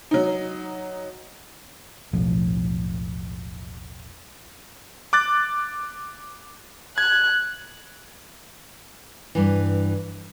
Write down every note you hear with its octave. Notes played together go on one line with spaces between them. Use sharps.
F#3 D#4
E1 B1 A2 F3
D6 F#6 A6
F#6 G#6
G2 E3